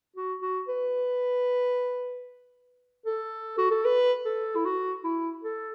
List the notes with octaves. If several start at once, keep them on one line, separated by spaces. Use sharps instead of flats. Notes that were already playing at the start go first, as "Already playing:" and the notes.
F#4
F#4
B4
A4
F#4
A4
B4
A4
E4
F#4
E4
A4